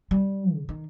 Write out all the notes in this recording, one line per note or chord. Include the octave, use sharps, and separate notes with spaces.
G3
C#3
D#3